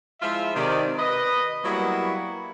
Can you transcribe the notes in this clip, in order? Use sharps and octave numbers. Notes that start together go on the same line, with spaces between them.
F3 G#3 E4 F4 E5
C3 D#3 D5
B4 D#5
F#3 G3 A#3 B3 E4 F#4